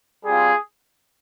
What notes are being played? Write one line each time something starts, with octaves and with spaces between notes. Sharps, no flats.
G3 C4 F4 G#4